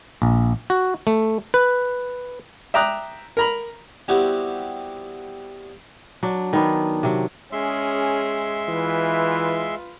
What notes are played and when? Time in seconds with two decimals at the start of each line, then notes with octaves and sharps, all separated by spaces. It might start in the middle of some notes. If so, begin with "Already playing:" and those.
0.22 A#1
0.70 F#4
1.07 A3
1.54 B4
2.74 E5 G5 A#5 D6 D#6 F#6
3.37 A#4 A#5 B5
4.08 G3 B3 C4 E4 F#4 G4
6.23 F#3 D4
6.53 D#3 B3 D4
7.03 C3 F#3
7.53 G#3 C#4 G#4 E5 C6
8.69 E3 F4 B4